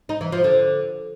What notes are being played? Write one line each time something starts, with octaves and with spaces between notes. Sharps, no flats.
D#4
E3
F3
D3